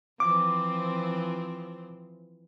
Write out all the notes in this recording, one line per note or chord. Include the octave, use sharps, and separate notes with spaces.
E3 F3 C4 D6